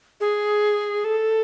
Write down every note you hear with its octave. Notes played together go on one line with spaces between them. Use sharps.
G#4
A4